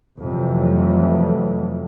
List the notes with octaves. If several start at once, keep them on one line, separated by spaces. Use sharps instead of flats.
F2 C3 E3 F#3 A3